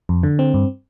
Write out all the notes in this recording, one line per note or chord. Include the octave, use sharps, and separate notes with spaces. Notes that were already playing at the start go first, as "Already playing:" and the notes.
F2
D3
C4
G2